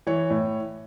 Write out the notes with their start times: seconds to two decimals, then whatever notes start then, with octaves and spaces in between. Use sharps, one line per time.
0.07 E3 C#5
0.30 A2